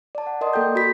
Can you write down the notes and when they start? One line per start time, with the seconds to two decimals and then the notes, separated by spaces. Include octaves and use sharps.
0.15 D5 A5
0.27 F#5
0.41 A#4 D5 D#5 C6 D#6
0.53 A#3 A4 G5 G6
0.76 F#4 B5 B6